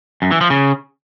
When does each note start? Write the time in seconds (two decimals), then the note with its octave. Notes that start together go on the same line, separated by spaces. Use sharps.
0.22 F#2
0.31 E3
0.41 F3
0.50 C#3